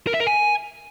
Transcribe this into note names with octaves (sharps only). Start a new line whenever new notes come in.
A#4
E5
A#4
G#5